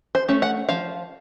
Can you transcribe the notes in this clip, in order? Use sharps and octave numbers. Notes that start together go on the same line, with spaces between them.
C5
A3 C#4
F#5
F3 F5